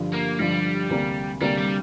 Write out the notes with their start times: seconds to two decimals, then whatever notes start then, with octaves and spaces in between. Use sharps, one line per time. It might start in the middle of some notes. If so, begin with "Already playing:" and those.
Already playing: G2 D3 F3
0.14 A#3
0.39 G2 D3 F3 G3
0.90 D2 C3 A#3 D4
1.41 D2 C3 G3 A#3 D4
1.59 G3